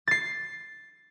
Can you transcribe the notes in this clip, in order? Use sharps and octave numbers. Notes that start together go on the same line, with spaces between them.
A6 C7